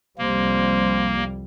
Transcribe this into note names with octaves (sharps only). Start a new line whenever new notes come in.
C2 F2 G3 A#3 C5